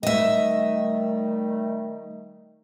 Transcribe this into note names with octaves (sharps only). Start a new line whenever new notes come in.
D#3 G3 A3 D#5 E5